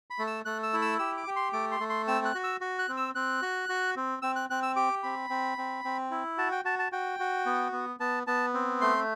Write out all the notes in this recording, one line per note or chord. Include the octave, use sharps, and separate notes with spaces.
B5
A3
E6
A3 F#6
E6
E4
E6
G4 E6
D6
G4
C6
A3 D6
C6
A3
C6
C4 E6
F#6
F#4
E6
F#4
F#6
C4
E6
C4 F#6
F#4
F#4
C4
C4 E6
F#6
C4 F#6
E6
G4 D6
C4 B5
C4
C4
C4
E4
F#4 A5
G5
F#4 A5
A5
F#4 G5
F#4
B3
B3
B3 A5
B3 A5
C4
A3 C6